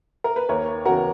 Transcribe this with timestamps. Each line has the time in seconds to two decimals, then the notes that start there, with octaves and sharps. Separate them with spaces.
0.24 A#4
0.36 B4
0.49 D#2 A#4 C#5
0.85 C#3 E3 B3 F#4 A#4